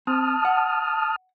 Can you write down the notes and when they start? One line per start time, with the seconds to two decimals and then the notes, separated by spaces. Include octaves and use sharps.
0.07 C4 A5 D#6 F6
0.45 F#5